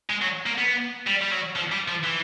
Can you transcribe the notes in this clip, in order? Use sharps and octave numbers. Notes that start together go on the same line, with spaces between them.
G#3
F#3
A#3
B3
G3
G3
F#3
F3
G3
F3
E3